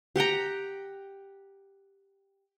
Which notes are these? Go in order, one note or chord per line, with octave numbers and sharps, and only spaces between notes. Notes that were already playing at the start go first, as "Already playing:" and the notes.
G4 F#5 G5 A#5